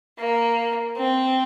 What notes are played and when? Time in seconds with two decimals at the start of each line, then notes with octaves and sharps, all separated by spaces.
0.18 A#3
0.97 C4